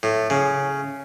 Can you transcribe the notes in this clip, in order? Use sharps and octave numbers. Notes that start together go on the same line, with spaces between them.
A2
C#3